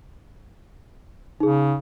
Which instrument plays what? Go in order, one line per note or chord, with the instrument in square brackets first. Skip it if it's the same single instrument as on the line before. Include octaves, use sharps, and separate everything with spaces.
[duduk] C#3 [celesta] D#4 G#4